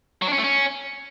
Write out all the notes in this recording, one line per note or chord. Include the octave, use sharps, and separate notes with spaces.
F#3
D4
C#4
A3
C#4